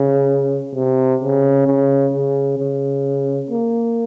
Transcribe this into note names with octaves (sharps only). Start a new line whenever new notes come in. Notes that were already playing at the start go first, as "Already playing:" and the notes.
Already playing: C#3
C3
C#3
C#3
C#3
C#3
A#3